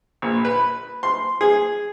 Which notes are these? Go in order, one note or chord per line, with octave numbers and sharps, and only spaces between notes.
A#1
B4
C6
G#4